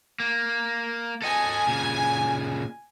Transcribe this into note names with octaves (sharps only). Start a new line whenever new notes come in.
A#3
A4 D#5 G#5
A#2 C#3